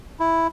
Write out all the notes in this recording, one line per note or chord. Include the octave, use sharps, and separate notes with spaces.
E4